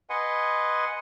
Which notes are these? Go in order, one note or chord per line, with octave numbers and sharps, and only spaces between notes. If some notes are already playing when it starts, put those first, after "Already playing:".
B4 D#5 F#5 G#5 C6